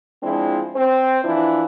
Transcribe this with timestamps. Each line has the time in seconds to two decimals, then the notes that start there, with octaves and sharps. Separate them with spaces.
0.22 F3 G#3 C4 D4 E4
0.75 C4 C5
1.24 E3 F3 D4 E4